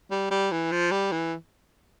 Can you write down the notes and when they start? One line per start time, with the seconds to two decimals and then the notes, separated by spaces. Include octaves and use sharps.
0.11 G3
0.31 G3
0.52 E3
0.72 F3
0.91 G3
1.12 E3